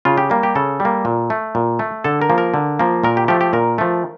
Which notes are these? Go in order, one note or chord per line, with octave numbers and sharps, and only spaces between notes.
C#3 F4
G4
G3 A#3
G4
C#3 A4
G3
A#3
A#2
A3
A#2
A3
D3 A4
A#4
F3 A#3
A#4
D3
F3 A#3
A#2 A#4
G4
F3 A3 G4
G4
A#2 A#4
F3 A3